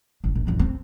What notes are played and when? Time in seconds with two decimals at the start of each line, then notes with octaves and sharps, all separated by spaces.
0.24 A1
0.35 A#1
0.47 A1 F2
0.59 C4